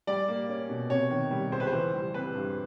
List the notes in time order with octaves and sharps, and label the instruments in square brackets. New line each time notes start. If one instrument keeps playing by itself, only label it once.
[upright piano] G3 D5
A#3
C#4
B2
C3 C#5
D#3
G3
C#2 C5
B4
C5
E3
G3
C4 B4
G2